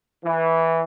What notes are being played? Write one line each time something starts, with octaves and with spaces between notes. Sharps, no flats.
E3